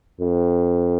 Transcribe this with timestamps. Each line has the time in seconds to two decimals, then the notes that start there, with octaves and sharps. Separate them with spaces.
0.21 F2